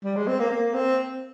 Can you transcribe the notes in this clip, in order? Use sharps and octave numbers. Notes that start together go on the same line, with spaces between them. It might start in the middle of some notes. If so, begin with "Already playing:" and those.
G3
G#3
C4
A#3
A#3
C4